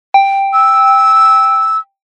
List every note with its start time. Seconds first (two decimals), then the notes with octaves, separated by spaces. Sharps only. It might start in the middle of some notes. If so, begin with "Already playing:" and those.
0.14 G5
0.53 E6